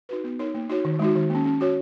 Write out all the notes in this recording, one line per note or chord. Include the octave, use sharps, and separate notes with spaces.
D#4 F#4 B4
B3
D#4 A#4 C#5
A#3
D#4 F#4 C#5
D#3
G#3 D#4 F#4
D#3
A#3 C#4
C#4
F#4 C#5